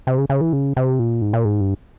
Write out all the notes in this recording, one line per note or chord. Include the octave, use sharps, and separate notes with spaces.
C3
C#3
C#3
E3
C#3
C3
A#2
G#2
A#2
G#2
G2